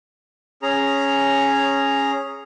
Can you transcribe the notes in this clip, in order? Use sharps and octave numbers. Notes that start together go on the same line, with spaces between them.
C#4 G#4 A#5